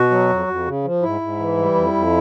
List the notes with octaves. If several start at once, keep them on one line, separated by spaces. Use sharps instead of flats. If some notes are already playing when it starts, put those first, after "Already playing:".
Already playing: B2 F#4
F#3
F2
F2
C#3
F3
G#2 E4
G#2
E3
G3
F2
F2